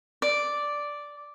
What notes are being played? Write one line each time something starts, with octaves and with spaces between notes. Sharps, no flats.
D5